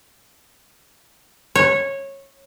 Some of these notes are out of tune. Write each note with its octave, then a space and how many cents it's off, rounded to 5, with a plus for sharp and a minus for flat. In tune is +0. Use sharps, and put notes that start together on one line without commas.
C#5 -15